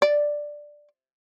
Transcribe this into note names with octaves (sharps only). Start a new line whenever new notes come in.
D5